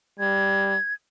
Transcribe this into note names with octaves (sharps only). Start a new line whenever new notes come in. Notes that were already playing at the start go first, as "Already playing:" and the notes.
G3 G#6